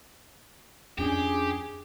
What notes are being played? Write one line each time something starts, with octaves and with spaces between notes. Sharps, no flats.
F2 C#4 D4 G4 G#4